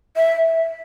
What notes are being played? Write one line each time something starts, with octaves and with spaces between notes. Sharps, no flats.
E5